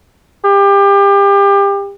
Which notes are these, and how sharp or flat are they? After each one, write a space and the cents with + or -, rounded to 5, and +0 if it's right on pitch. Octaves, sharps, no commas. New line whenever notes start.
G4 +30